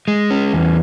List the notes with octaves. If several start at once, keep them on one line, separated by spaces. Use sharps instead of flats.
G#3
C#4
E2